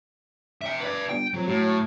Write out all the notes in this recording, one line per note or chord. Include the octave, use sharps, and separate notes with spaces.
E5 G5
B4 D5
G1 G5
F2 F#3
A2 F#3